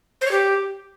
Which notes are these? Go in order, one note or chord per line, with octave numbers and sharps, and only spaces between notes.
C5
C#5
G4